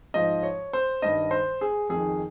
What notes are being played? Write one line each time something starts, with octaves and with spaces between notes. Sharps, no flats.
G#2 F3 D#5
C#5
C5
G2 D#3 D#5
C5
G#4
F2 D#3 G#4